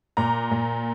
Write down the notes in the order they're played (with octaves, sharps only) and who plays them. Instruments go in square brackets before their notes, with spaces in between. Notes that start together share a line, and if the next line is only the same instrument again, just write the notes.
[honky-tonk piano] A#2 A#5
A#2